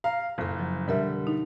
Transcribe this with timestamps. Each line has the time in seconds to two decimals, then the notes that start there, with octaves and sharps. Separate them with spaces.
0.04 F5 A#5
0.38 F#1 F2 A4
0.59 F3 F#3
0.88 B2 D3 G3 A#4 E5
1.27 D#4